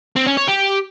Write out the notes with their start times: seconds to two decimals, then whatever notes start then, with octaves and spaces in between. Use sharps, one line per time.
0.16 C4
0.27 C#4
0.37 C#5
0.48 G4